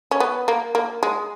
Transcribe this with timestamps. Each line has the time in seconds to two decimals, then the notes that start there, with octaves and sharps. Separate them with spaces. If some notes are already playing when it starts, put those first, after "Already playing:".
0.11 C#4
0.20 B3
0.48 A#3
0.75 A#3
1.03 G#3